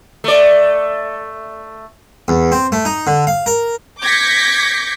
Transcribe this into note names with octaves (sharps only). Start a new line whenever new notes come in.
A3 D5
E2
C4
A3
D#4
D3
F5
A#4
D6 G6 G#6 A#6 B6 C#7